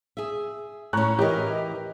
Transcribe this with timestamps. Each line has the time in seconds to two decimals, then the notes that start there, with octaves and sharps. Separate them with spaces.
0.17 G#4 E5
0.93 A2 C#4 A#5 C#6 F#6
1.19 E3 G4 A#4 D#5